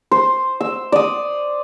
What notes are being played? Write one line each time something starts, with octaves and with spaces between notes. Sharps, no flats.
C5
E6
D5 D#6